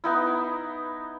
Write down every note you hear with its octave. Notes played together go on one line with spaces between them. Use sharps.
B3 D#4 E4